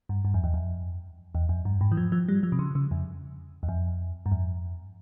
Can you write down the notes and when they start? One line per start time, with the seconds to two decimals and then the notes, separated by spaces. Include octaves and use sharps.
0.09 G2
0.25 G2
0.34 F2
0.44 E2
0.54 F2
1.35 E2
1.49 F2
1.65 G2
1.81 G#2
1.92 E3
1.97 F3
2.12 F3
2.29 G3
2.43 F3
2.52 C3
2.59 C#3
2.75 C#3
2.91 F2
3.63 E2
3.69 F2
4.26 G2
4.32 F2